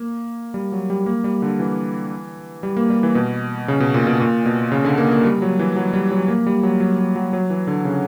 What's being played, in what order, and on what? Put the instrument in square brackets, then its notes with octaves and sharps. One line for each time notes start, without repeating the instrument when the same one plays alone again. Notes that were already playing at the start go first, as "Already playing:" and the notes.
Already playing: [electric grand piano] A#3
G3
F#3
G3
A#3
G3
D3
E3
G3
A#3
G3
E3
B2
C#3
B2
A#2
B2
A#2
B2
C#3
D3
A#3
A#3
G3
F#3
E3
F#3
G3
F#3
A#3
G3
F#3
F#3
F#3
F#3
F#3
E3
D3
C#3